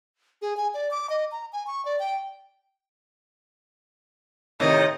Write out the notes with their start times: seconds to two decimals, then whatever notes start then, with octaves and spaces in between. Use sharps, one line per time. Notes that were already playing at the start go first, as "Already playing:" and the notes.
0.42 G#4
0.57 G#5
0.74 D5
0.91 D6
1.10 D#5
1.32 A#5
1.53 G#5
1.67 C#6
1.85 D5
1.99 G5
4.60 A2 C3 D#3 D#5